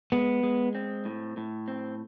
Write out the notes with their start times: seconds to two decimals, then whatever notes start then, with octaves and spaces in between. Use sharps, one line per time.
0.12 G#3 B3
0.43 G#3
0.75 C4
1.05 A2
1.37 A2
1.68 C4